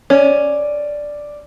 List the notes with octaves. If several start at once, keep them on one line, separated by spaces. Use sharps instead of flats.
C#4 D5